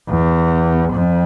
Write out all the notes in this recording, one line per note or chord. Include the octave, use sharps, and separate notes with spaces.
E2
F2